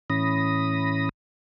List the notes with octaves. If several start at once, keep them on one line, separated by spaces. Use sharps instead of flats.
A2 E3 C#4 B5 D#6 A#6